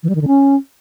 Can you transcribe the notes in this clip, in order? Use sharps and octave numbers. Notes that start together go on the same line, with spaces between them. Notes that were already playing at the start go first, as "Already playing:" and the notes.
E3
G3
D#3
D3
C#4